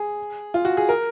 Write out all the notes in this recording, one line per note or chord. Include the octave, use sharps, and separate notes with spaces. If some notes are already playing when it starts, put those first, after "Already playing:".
Already playing: G#4
F4
F#4
G#4
A#4